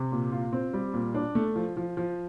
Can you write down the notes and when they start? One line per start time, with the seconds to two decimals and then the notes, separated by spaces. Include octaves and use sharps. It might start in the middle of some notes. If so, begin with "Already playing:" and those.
Already playing: C3
0.12 A#2
0.32 F4
0.53 C4
0.73 G3
0.94 A#2
1.14 D4
1.35 A3
1.56 F3
1.77 F3
1.97 F3